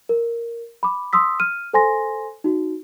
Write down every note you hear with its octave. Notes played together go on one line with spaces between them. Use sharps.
A#4
B5 D6
C6 D#6 E6 B6
F6 D#7
A4 C5 G#5 C6 A#6
D#4 F#4